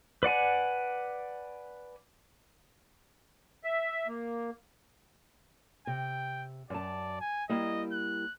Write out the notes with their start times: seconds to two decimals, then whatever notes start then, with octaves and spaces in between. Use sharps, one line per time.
0.23 B4 D5 F#5 G#5
3.64 E5
4.07 A#3
5.87 C3 G5
6.70 F#2 D5 A5
7.21 G#5
7.49 G3 A#3 E4 D#5
7.92 F#6